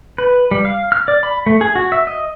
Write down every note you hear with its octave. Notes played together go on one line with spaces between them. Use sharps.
B4
G3
F5
F6
D5
B5
A3
G#4
F#4
E5
D#5